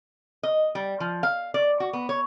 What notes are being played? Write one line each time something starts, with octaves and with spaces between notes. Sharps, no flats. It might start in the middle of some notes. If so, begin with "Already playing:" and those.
D#5
G3
F3
F5
D5
F#4
B3
C#5